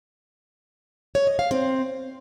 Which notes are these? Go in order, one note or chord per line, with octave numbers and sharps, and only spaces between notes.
C#5
D#5
F5
C4